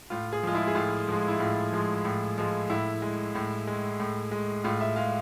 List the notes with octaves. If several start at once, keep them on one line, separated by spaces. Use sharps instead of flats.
A2 F4
G#4
F3 G#3 F4
E4
G#4
A2 F4
F3 G#3
E4
A2 F4
F3 G#3
A2
F3 G#3
A2 E4
G#3
A2
G#3
A2
G#3
A2 F4
E5
G#3 F5